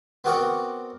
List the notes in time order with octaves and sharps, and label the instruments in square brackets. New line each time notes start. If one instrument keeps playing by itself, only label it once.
[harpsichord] B3 C4 F#4 A#4 D5 F#5